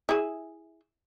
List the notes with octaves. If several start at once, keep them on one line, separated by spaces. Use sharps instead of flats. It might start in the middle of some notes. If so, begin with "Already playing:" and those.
E4 G#4